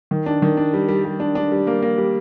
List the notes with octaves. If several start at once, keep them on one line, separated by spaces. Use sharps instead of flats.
D#3
D4
D#3
D4
G3
G3
G3
D4
D4
G3
A#3
A#3
G3